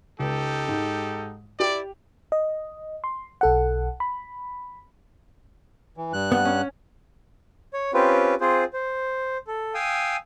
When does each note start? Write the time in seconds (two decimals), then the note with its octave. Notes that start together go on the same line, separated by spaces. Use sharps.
0.20 C#2 D#4 G4 A4
0.68 G#2 G#3
1.60 E4 G4 D5
2.32 D#5
3.04 C6
3.41 B1 A4 F#5
4.00 B5
5.97 E3
6.13 G2 F#6
6.32 B3 F#5
6.45 C#4
7.73 C#5
7.94 C4 C#4 F4 G4 B4
8.41 C4 F4 G#4 C5
8.73 C5
9.47 A4
9.74 F5 G5 G#5 D#6 E6